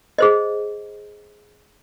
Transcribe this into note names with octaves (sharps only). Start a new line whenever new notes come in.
G#4 C5 D#5